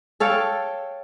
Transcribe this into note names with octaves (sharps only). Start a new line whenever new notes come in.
A4 C#5 F5 G5